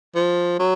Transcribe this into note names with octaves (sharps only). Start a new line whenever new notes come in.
F3
F#3